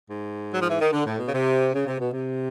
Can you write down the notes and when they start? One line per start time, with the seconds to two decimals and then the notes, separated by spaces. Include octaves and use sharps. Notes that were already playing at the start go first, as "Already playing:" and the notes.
0.08 G#2
0.51 F#3
0.61 F3
0.70 E3
0.80 D#3
0.91 D3
1.05 A2
1.18 B2
1.25 C#3
1.33 C3
1.74 C#3
1.86 C3
1.99 B2
2.12 C3